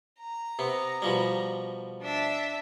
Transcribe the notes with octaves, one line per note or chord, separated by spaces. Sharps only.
A#5
C3 B3
B2 F3 G3
D4 E5